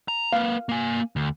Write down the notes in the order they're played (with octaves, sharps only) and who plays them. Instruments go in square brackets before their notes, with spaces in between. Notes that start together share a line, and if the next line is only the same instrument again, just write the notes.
[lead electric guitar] A#5
[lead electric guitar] A#3 B4 [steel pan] F5
[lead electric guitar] A#3 G#5
D2